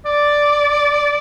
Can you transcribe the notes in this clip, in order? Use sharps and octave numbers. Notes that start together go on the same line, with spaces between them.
D5